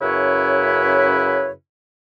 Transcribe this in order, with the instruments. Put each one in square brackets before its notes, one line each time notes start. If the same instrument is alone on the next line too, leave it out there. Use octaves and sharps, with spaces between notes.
[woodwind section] F#2 C#3 E4 B4 C#5